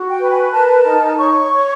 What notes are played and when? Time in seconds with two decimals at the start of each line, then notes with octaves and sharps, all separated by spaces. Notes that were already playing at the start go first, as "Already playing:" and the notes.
Already playing: F#4
0.09 G5
0.20 B4
0.30 G#5
0.52 A#4 A5
0.85 D#4
1.18 C#5 C#6
1.51 C#5